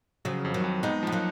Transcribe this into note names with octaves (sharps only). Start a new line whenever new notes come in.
C#3 F3 F#3
F2
D#3 F#3
F2
G#3 B3 D#4
F3 B3
F#3 A#3